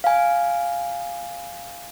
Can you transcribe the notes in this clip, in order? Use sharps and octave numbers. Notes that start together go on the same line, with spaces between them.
F5 G#5